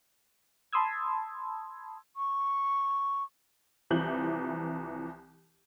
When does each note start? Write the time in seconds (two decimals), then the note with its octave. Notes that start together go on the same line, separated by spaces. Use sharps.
0.73 A5 B5 C6 D#6 E6 G#6
2.16 C#6
3.90 C2 E3 F3 G6 F#7